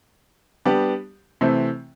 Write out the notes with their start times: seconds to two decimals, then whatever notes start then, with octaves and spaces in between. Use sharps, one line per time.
0.65 G3 B3 D4 G4
1.41 C3 E3 A3 C4